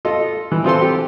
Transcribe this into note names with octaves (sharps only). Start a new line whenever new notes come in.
F4 A4 D#5
E3
C4 F4 A4 C6
G4 G5